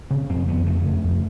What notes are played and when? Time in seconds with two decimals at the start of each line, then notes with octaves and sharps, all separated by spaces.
0.11 C#3 C4
0.29 F2 C4
0.48 F2 B3
0.66 C#3 A3
0.85 C#3
1.04 F2